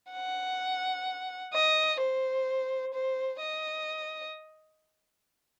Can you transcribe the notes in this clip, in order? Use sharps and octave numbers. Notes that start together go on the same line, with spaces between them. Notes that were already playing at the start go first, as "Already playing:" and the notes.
F#5
D#5
C5
C5
D#5